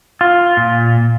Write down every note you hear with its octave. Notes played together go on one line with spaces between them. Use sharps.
F4
A#2